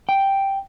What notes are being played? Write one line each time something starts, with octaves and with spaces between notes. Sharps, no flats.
G5